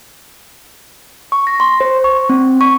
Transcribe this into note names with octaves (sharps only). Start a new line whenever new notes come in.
C#6
A#6
C6
C5
C#6
C4
C#6